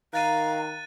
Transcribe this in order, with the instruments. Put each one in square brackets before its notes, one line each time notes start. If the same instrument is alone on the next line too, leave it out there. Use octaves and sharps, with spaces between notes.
[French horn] D#3 [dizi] F5 [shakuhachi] A#5 [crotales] F#6 A6 D#7